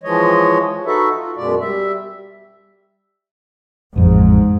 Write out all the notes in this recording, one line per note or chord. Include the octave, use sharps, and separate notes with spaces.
E3 F3 G#3 C#5 D#5
D#4 F#4 A4 B4 E5
F4
F#2 B2 G#3 D5
G3 E5
A1 F2 G#2